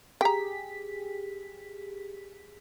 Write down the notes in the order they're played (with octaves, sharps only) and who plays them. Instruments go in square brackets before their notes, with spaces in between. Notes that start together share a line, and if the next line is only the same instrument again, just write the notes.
[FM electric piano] G4 G#4 B6 [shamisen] G5 A#5